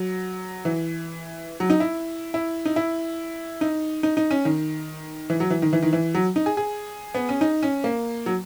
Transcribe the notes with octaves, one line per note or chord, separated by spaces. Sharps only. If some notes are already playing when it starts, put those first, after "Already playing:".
Already playing: F#3
E3
F#3
D#4
E4
E4
D#4
E4
D#4
D#4
D#4
C#4
D#3
E3
F#3
E3
D#3
E3
D#3
E3
F#3
D#4
G#4
G#4
B3
C#4
D#4
C#4
A#3
F#3